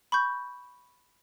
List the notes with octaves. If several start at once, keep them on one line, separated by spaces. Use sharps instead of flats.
B5 C#6 G6